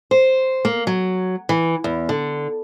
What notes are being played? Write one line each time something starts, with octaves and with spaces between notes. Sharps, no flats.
C5
A#3
F#3
E3
E2
D3